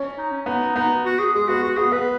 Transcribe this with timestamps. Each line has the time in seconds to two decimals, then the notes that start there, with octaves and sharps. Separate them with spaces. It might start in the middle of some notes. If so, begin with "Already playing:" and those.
Already playing: C#4
0.18 D#4
0.32 C#4
0.46 B3 D#4
0.76 B3 D#4
1.05 F#4
1.19 G#4
1.34 G#3 G#4
1.48 B3 F#4
1.64 F#4
1.77 B3 G#4
1.92 B3 B4